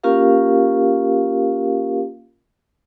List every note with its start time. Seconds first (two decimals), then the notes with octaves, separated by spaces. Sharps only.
0.04 A#3 C#4 F4 G4 A#4 F5